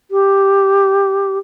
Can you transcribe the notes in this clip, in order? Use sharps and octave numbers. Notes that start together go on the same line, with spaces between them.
G4